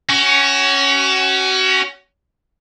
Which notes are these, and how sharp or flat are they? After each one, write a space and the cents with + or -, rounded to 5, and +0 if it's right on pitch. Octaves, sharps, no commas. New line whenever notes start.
C#4 +0 F#4 +30